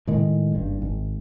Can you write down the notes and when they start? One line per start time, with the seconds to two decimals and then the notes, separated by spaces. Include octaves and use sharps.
0.07 A2 D#3 G#3
0.52 F#1 G2
0.82 G#1